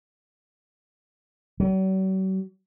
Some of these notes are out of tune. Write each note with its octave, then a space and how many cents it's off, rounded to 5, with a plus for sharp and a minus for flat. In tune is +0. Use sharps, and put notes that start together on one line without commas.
F#3 +45